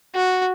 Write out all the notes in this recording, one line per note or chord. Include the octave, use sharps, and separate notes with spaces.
F#4